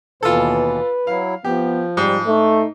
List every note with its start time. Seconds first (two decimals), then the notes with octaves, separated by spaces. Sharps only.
0.23 D#2 B2 E3 F4 A4 B4
1.07 F#3 E4 F5
1.45 F3 B3 G4
1.97 G#2 G3
2.27 A3 D#4